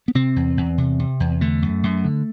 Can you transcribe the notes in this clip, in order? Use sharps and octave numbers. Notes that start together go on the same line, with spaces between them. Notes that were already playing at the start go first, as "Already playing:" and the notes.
B3
C3 C4
E2
E2
C3
C3
E2
D3 A3
F#2
F#2
D3